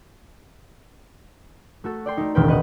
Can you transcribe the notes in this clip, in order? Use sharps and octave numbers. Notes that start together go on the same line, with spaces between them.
A3 F#4 A4
D5 G5 C6
A3 D#4
E1 C2 A#2 D#3 B4 G5
B4 D#5 F#5 D#6